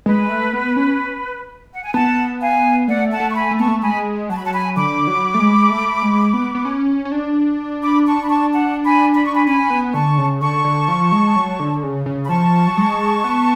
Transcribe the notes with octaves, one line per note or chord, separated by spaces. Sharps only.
G#3 B4
A3
B3
C#4
F#5
G#5
B3 F#5 A5
F5 G#5
A3 D5 F#5
F#5 A5
A3
C#6
G#5 B5
A3
B3 A5 C#6
A3
G#3 G#5 B5
F#3 A5
B5
F#5 A5
G#5 B5
D3 B5 D6
F#3
A3
G#3
A3
G#3
B3
B3
C#4
C#4
D4
B5 D6
A5 C#6
B5
A5 C#6
F#5 A5
G#5 B5
B5
C#6
G#5 B5
C#4 G#5 B5
B3
D3 A5 C#6
C#3
D3 A5 C#6
D3
F3
G#3
F#3
D3
C#3
C#3
B5
F3 A5 C#6
F#3
G#3
B3